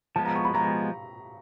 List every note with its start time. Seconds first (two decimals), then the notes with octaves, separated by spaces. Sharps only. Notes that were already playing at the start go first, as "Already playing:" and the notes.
0.16 F3 G#3 B3 A5
0.25 A#5
0.35 C#6
0.45 B5
0.54 F3 G#3 B3 A#5